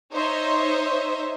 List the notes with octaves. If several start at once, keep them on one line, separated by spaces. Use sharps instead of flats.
D#4 C5 C#5 D#5 E5